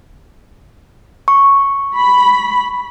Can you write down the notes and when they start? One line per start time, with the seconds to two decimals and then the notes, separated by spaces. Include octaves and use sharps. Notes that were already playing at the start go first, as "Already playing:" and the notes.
1.28 C#6
1.97 B5